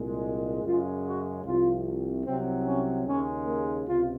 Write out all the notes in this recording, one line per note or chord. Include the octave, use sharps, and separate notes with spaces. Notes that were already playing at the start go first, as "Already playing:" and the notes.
Already playing: C2 A#2 G#3
F#2 C#3 G#3 F4
F#4
C2 C3 F3 F4
C2 C3 F#3 C4
C#4
D#2 C#3 G#3 C#4
A#3
C#2 C3 F4